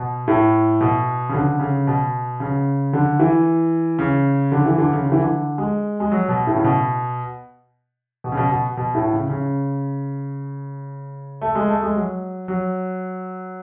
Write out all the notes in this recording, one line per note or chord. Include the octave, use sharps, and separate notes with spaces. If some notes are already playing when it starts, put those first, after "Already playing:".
Already playing: B2
A2
B2
C#3
D3
C#3
B2
C#3
D3
E3
C#3
D3
E3
D3
C#3
D3
E3
D3
G#3
G#3
F#3
B2
A2
C#3
B2
B2
C#3
B2
B2
B2
A2
C#3
C#3
A3
G#3
A3
G#3
F#3
F#3